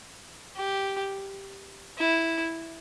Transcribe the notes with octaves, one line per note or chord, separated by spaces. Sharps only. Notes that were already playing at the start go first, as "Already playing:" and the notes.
G4
E4